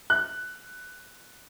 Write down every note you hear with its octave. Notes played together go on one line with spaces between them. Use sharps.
F#6